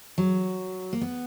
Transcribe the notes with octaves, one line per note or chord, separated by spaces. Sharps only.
F#3
A#3
B3